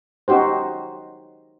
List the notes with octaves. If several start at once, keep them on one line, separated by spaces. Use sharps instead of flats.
C#4 D#4 F#4 G4 C5